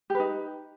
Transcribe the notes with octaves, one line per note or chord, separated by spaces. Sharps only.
D#4 G4 B4